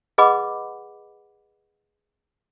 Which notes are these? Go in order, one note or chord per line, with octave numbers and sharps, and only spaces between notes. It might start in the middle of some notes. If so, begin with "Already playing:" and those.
G#4 B4 D#5 F#5 B5 D6